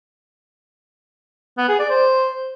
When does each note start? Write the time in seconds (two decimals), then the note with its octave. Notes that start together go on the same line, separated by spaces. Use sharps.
1.57 B3
1.68 G#4
1.79 D5
1.90 C5